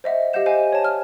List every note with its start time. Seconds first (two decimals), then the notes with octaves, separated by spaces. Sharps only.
0.04 C5 D#5 E5 F#5
0.33 G4 D#5 F5 F#5 G6 E7
0.46 C5 D#5 F5 F#5 G#5
0.73 C#5 A5
0.85 F6